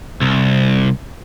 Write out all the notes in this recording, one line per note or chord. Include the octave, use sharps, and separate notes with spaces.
C2